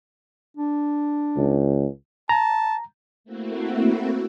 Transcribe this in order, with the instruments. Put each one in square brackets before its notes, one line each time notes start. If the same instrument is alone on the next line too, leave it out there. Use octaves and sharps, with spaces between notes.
[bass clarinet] D4
[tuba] C#2
[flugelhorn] A5 [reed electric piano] A#5
[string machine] A3 A#3 C4 E4 F#4